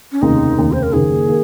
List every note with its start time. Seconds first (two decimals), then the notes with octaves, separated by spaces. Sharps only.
0.12 C#4
0.22 F1 D#2 C#3 D#4
0.57 F1 D#2 C#3
0.73 C5
0.83 A#4
0.93 F#1 F#2 D#3 A#3 G#4
1.28 D#3 A#3